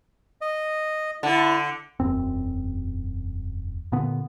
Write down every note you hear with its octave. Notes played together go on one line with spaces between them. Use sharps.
D#5
D3 E4 A5
E1 F#2 C4
A#2 D3 B3